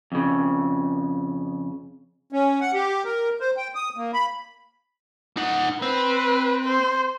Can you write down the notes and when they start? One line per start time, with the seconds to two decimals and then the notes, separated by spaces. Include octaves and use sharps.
0.12 F2 C#3
2.33 C#4
2.61 F#5
2.74 G4
3.05 A#4
3.40 C5
3.57 G5
3.75 D#6
3.97 A#3
4.14 B5
5.37 D#4 F#5
5.82 C4 B4
6.64 C5